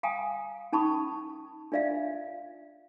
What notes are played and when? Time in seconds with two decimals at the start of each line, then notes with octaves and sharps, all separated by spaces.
0.03 F5 G5 G#5 A#5 D#6
0.73 C#4 D#4 A5 B5 C#6 D#6
1.72 D4 F4 D5 E5 F5